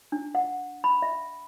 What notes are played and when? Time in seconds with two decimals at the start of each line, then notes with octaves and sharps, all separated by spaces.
0.12 D4
0.35 F#5
0.84 B5
1.02 E5